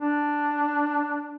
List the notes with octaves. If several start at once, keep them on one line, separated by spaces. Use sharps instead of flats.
D4